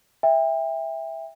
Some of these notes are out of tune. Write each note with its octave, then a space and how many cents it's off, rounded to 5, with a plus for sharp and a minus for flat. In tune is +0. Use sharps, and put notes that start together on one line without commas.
E5 -5 G5 +35